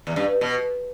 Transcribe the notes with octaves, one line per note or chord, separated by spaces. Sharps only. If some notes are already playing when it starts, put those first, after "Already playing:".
E2
G2
B2